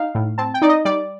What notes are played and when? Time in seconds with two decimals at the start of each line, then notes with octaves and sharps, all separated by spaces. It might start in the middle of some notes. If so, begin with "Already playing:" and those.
Already playing: D#4 F5
0.15 A2
0.38 C4 A5
0.54 G5
0.62 D#4 D5
0.69 D#5
0.85 G3 D5